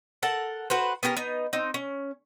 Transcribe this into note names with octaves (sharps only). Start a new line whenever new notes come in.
A4 A#4 F#5 A5
F#4 B4 C5
B3 C#4 G4 A#4
B3 D#4
C4 D#4
C#4